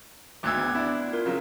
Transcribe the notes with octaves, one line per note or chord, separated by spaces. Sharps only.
G#1 D2 D6 E6 F#6 G#6
B3
D4 E4
F4 A#4
C#3 F#3